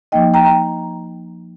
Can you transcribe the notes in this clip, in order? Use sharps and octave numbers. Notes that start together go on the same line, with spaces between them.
F3 A#3 D#4 D#5 G5
G5 A#5
G5 A#5